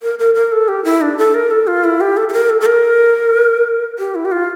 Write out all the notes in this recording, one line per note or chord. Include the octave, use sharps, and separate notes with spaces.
A#4
A#4
A#4
A4
G4
E4
D4
A4
A#4
A4
F4
E4
G4
A4
A4
A#4
A4
A4
A#4
G4
E4
G4
F4